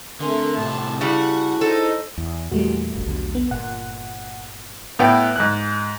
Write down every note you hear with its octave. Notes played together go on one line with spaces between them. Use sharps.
D3 A3 C4 A#4 G#5 C6
A2 C3 A5
C#3 G3 E4 F#4 G#4 F#5 A5
D#4 A4 C5
E2
E2 A#2 G3 A3 F#4
F1 A#1
B1 E2 D3
B3
G1 A#2 F#5
A2 B3 F#5 G5
G#2 F#6